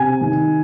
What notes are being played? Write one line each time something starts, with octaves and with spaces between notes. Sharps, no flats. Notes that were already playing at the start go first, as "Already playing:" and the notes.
Already playing: C3 G#5
D#3